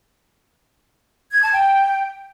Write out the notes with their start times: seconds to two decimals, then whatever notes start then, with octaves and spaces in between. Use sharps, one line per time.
1.32 G#6
1.42 A5
1.53 G5